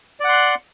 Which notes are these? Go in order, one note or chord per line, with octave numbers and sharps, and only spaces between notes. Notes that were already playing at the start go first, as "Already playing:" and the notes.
D5 F#5 C6 F#6